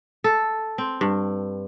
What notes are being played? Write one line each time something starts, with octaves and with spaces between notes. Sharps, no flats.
A4
C4
G2